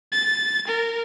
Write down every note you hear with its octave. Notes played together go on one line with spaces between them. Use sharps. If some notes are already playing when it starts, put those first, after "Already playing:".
A6
A#4